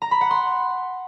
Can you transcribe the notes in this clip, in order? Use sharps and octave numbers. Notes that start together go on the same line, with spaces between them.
A#5
B5
F#5
C6